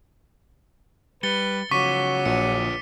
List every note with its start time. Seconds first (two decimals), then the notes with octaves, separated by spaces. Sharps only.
1.23 G3 B4 A6 C#7 G7
1.71 C#3 F3 F#3 C#6 D6 B6 D#7
2.25 A#1 F4 B4 C#5 C#7